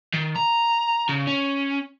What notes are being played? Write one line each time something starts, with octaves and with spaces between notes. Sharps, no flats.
D#3
A#5
C#3
C#4